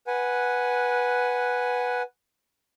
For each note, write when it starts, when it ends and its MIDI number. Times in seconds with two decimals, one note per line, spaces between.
0.07 2.02 71
0.07 2.02 78
0.07 2.02 80